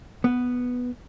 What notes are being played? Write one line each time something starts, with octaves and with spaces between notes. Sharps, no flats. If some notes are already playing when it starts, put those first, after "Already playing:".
B3